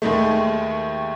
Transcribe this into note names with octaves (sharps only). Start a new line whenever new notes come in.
D#2 D#3 G#3 A3